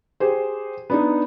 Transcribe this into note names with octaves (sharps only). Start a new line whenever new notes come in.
G4 G#4 C5
B3 D4 D#4